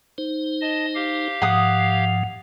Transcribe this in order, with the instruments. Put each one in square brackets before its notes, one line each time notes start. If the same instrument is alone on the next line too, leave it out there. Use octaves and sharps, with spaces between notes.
[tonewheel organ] D#4 C5
[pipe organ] D#5 A5
G4 F5
[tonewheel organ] G#2 F3 [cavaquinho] F#5 D#6